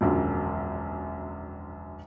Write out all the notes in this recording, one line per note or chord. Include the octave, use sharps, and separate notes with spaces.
E1 A#1 F#2 D3